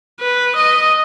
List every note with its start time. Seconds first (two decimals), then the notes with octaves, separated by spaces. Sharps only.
0.20 B4
0.56 D#5